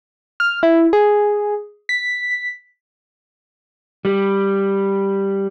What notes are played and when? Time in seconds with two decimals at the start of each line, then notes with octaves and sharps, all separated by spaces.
0.40 F6
0.63 E4
0.93 G#4
1.89 B6
4.05 G3